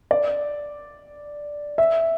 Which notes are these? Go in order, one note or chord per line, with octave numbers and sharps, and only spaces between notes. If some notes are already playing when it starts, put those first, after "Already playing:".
D5
E5